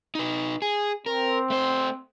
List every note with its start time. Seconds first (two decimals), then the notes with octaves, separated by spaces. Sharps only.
0.15 D#4 B4
0.62 G#4
1.06 C4 A#4
1.50 A3 C5